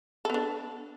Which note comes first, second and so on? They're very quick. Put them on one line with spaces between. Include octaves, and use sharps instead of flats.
A4 B3 D4